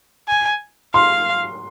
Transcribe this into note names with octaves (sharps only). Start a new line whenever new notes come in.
G#5
F5 C6